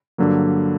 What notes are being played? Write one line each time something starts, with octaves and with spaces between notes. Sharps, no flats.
G2 D3 F#3 A#3